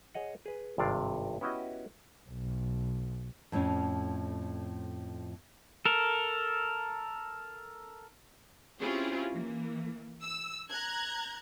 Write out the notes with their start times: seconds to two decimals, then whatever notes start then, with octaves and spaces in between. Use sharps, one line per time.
0.14 G#4 C#5 D#5 F#5
0.46 G#4 B4
0.78 G#1 G2 C3 D5 F5
1.41 B3 C#4 E4 F#4 G4 D#5
2.29 B1
3.52 F2 A2 F3 C#4
5.86 A4 A#4
8.80 C4 C#4 E4 F4 G4 G#4
9.32 E3 A#3
10.21 E6
10.69 A#5 F#6 G#6